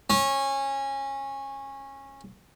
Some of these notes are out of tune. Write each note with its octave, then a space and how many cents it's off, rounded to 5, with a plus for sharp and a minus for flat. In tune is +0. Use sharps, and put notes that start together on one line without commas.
C#4 -20